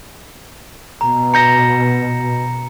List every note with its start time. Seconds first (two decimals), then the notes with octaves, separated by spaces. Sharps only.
1.01 B2 A#5
1.34 A#5 G6 A#6 C#7 E7